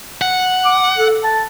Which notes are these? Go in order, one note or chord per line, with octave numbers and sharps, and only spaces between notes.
F#5
D6
A4
A5